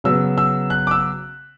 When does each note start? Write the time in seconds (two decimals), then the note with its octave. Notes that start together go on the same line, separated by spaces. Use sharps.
0.04 C#3 F#3 B3 E6
0.38 E6
0.70 F#6
0.87 D6
0.91 E6